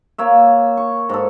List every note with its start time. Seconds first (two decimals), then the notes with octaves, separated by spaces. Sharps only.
0.18 A#3 C#5 E5
0.77 C#6
1.09 G#2 A4